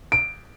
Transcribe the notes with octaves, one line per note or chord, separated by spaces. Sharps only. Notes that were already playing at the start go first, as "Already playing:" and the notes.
D7